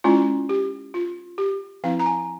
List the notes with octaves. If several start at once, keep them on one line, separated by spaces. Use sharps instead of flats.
G#3 C#4 E4 F4
G4
F4
G4
F3 C4 E4 F5
A#5
G#5